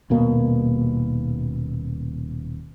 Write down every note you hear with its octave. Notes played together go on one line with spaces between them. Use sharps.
D#1 B2 A#3